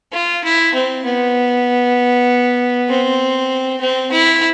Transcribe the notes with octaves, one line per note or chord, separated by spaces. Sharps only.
F4
E4
C4
B3
C4
C4
E4